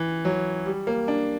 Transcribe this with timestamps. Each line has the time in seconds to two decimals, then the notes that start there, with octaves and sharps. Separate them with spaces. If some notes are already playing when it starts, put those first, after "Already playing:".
Already playing: E3
0.25 F#3
0.66 G3
0.87 A#3
1.08 D4